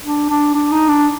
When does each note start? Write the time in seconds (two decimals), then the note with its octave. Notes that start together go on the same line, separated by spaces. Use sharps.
0.04 D4
0.30 D4
0.55 D4
0.72 D#4
0.89 D4